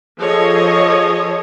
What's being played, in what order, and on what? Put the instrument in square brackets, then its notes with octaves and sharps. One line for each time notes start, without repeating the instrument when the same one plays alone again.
[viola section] F3 G#4 A4 C#5 D#5